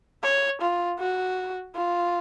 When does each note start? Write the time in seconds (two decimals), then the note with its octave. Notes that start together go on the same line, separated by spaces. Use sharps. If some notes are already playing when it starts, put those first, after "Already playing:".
0.23 C#5
0.61 F4
1.00 F#4
1.75 F4